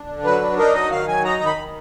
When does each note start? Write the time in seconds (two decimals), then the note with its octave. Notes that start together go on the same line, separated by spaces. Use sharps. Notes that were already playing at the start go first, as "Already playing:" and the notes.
Already playing: D4
0.08 D3
0.24 F#3 B4
0.41 D4
0.57 D#4 A#4
0.74 F#3 D#5
0.91 D#3 F5
1.07 F#3 G#5
1.24 D#4 A#5
1.40 D#3
1.46 B5
1.57 D#3